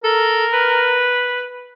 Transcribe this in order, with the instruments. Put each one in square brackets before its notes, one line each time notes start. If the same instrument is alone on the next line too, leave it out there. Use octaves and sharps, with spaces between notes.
[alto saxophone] A4 [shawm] A#4
[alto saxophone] B4